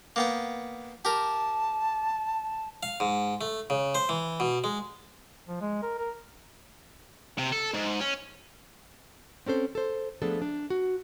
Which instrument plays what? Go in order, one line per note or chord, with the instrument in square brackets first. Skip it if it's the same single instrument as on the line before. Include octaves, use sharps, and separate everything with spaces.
[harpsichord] A#3 B3 G5
[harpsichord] G4 A#4 [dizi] A5
[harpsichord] F5
G#2
A3
C#3
C5
E3
B2
G#3
[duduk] F3
G#3
A#4
A#4
[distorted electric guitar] C3
A4
G#2
C#4
[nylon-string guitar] C4 C#4 A4 C5
A4 C5
F3 A3 B3 D4 G#4 A4
D4
F#4